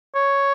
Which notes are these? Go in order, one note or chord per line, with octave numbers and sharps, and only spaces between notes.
C#5